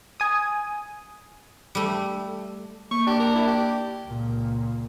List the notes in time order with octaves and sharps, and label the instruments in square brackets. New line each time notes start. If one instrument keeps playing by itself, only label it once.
[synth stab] G#5 D#6
[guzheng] G3 A3
[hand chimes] A#3 [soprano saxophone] C#6
[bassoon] D4 [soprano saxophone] G4
[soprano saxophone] A#4
E4
G4
[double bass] C#2 A#2